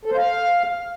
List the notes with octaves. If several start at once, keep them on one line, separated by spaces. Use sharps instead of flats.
A4
C5
F5